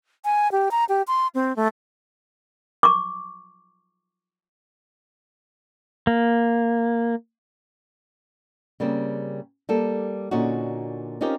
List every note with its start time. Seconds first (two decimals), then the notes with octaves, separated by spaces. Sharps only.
0.25 G#5
0.52 G4
0.71 A#5
0.89 G4
1.08 C6
1.35 C4
1.56 A3
2.83 C#6 D6
6.07 A#3
8.80 C#3 G3 A#3 C4
9.69 G3 A#3 A4
10.31 A#2 D3 C#4 D#4 F#4
11.21 C4 C#4 D#4 F4 G4 A#4